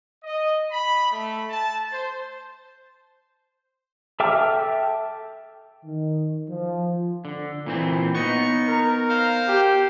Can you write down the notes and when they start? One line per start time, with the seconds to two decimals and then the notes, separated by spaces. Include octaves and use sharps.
0.24 D#5
0.71 B5
1.11 A3
1.50 A5
1.91 C5
4.20 A4 E5 G5 D6 F6
5.84 D#3
6.49 F3
7.25 D3
7.66 A#2 E3 C4
8.15 B3 D#4 C#6
8.68 A#4
9.09 C5 F5
9.48 G4